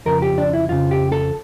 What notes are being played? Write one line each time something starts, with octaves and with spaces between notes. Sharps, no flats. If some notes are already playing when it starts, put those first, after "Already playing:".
F2 C#3 F3 A#4
G4
D4
E4
F2 C#3 F3 F4
G4
A4